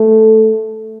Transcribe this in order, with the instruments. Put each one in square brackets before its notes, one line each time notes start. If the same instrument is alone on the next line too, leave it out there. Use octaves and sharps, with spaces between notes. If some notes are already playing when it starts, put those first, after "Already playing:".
Already playing: [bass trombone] A3